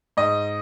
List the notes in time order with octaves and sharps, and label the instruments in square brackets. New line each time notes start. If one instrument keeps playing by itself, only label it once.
[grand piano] G#2 D#5